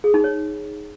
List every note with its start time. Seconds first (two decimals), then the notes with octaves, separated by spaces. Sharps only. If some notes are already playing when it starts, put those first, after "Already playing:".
0.04 G#4
0.14 D#4
0.24 C#5